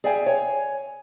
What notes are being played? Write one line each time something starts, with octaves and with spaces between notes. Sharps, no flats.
G#4 D5 E5 F5 G5 G#5
C#5 G#5